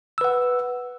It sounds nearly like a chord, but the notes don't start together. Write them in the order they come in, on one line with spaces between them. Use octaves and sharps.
E6 B4 F#5